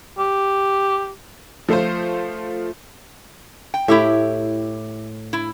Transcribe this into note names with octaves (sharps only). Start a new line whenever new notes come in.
G4
F3 A3 F4 C5
G5
A2 E4 G4 E5
E4